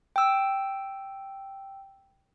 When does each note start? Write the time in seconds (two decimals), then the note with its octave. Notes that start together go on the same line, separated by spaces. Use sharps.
0.16 G5 E6